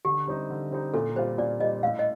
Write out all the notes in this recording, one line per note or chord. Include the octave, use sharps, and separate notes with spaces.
D3 G4
G3 C4 D#4
D3
G3 C4 D#4
A#2 A4
G3 C4 F4 C5
A#2 D5
G3 C4 F4 D#5
A2 F5
D#5